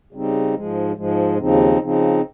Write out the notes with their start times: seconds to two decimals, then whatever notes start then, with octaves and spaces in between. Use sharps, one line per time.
0.13 C#3 G3 C4 D#4
0.55 G#2 F3 G#3
0.96 G#2 F3 G#3
1.38 D#2 C#3 F3 C4 D#4
1.81 C#3 F3 C4 D#4